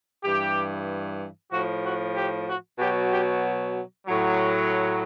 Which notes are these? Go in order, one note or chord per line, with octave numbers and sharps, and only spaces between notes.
G2 E3 G4
A2 F3 F#4
F#4
G4
F#4
B2 F#3 G4
G4
A2 F#3